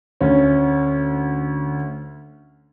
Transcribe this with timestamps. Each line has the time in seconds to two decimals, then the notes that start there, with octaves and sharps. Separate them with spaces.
0.21 D2 C#4